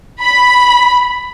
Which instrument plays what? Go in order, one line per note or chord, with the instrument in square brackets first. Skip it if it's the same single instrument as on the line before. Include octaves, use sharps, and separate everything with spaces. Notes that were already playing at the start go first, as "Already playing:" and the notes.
[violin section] B5